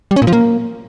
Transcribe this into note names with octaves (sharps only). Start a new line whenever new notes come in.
G3
C#4
A#2
F3
A#3